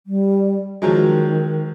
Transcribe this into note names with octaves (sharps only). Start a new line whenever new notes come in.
G3
D#3 F3 F#3 G#3